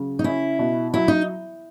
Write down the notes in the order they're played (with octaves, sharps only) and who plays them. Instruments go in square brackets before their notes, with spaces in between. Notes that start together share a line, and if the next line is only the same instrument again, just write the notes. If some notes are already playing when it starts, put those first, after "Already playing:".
Already playing: [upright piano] C#3 F#3
[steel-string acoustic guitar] D#4
[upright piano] C#4 [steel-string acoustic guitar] E4
[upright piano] B2
[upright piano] F#3 [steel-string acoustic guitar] E4
[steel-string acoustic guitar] D#4